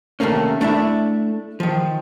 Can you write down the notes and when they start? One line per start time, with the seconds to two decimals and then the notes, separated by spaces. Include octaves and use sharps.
0.20 C3 D#3 A3 A#3 C#4
0.61 A3 D4 E4 E5
1.60 D#3 F3